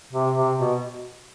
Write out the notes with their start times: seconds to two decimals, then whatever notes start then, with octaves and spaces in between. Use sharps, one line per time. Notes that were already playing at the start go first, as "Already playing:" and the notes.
0.13 C3
0.36 C3
0.59 B2